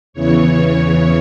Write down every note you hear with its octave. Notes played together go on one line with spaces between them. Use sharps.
E2 C#3 E3 C#5
C#5